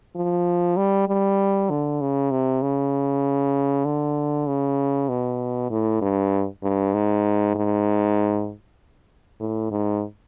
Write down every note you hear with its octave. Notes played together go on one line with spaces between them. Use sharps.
F3
G3
G3
D3
C#3
C3
C#3
D3
C#3
B2
A2
G2
G2
G#2
G#2
A2
G#2